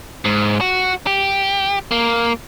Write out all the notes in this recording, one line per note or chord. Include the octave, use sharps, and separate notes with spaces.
G#2
F#4
G4
A#3